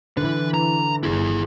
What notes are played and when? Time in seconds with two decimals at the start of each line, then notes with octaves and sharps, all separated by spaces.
0.17 D3 E3 B4
0.54 A#5
1.03 G1 E4 G#4